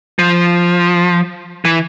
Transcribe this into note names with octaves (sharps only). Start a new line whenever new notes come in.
F3
E3